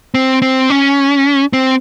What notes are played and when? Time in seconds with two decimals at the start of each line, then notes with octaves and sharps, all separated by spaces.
0.14 C4
0.42 C4
0.70 C#4
1.53 C4